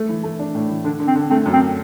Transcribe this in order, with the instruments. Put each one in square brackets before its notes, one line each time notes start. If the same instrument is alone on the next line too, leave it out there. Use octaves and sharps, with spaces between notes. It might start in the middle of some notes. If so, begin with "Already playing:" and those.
Already playing: [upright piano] A3
E3
A3
D4
A2
E3
[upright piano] D3 [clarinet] D4
[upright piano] D3
[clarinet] C4
[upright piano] D3
[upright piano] A3 [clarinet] C4
[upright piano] F#2
[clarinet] C4